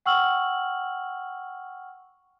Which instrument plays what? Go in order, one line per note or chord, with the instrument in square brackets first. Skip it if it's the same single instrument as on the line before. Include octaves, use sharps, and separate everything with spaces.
[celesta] F#5 G5 C#6 E6 F6 F#7